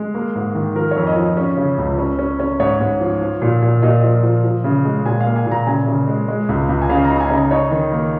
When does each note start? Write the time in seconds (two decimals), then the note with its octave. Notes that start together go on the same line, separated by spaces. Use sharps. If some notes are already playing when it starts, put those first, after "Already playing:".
Already playing: G#3
0.14 A#3
0.35 G#2
0.55 D#3
0.75 F3 A#4
0.91 F2 C#5
1.07 D#5
1.16 F3
1.37 C#4
1.57 C#3
1.78 C#2
1.98 C#4
2.19 C#4
2.40 C#4
2.60 G#2 C#5
2.80 G#2
3.01 F3
3.21 F3
3.42 A#2
3.62 A#2
3.82 A#2 D#5
4.03 F3
4.23 F3
4.44 F3
4.64 C#3
4.85 G#3
5.05 A#2 G#5
5.20 F5
5.26 A#3
5.36 G#5
5.46 A#2
5.51 A#5
5.67 C#3 G#5
5.87 C#3
6.08 G#3
6.28 G#3
6.49 C#2
6.69 C#2
6.82 G#5
6.89 C#3 F5
7.05 A#5
7.10 D#4
7.16 A#5
7.20 G#5
7.30 C#3 D#5
7.51 D#4 C#5
7.71 D#3
7.92 A#3